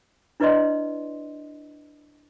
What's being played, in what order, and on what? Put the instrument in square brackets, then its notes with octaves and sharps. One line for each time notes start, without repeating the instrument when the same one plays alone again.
[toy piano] D4 E4 B4 D5 D#5 C6